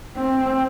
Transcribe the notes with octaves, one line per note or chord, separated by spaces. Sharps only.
C4